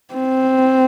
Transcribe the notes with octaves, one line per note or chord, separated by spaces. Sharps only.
C4